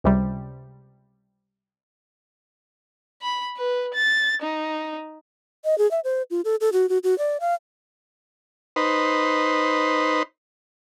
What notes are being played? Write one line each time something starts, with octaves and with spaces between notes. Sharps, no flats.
C#2 C3 G3
B5
B4
A6
D#4
D#5
G#4
E5
C5
F4
A4
A4
F#4
F#4
F#4
D5
F5
D#4 B4 C5